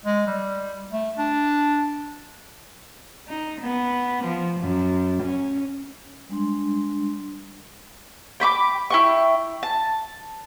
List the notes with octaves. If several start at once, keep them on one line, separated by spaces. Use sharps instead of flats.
G#3
G3
A3
D4
D#4
B3
F3
F#2
C#4
G3 G#3 D4 C6
G5 B5 C#6 D6
E4 G5 C#6
A5